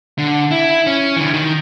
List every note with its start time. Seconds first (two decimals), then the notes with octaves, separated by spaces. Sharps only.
0.18 D3
0.51 E4
0.87 C#4
1.16 D3 E3
1.34 D#3